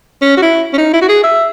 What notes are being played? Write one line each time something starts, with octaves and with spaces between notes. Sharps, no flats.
C#4
F#4
E4
C#4
D#4
E4
F#4
G#4
E5